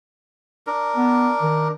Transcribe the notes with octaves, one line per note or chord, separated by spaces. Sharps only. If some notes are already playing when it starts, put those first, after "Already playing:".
D4 A#4
B3
D#3